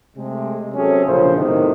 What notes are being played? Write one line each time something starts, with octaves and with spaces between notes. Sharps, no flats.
C3 G#3 A3
C3 F#3 C4 C#4 G#4 A4
A#1 C#3 C5
B1 A2 C3 D#3